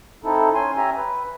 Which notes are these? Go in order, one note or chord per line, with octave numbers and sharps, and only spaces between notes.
C4 D#4 E4 A4
C#4 G#5 C6
C#4 G4 E5 G#5 A#5
B4